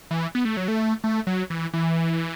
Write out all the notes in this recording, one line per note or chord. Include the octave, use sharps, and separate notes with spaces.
E3
B3
A3
F#3
A3
A3
F#3
E3
E3